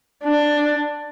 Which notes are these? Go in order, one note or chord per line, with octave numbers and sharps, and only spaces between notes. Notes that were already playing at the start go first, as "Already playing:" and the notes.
D4